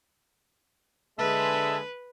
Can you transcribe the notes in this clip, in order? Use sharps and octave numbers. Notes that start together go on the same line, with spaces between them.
D3 G#3 B4 E5 A5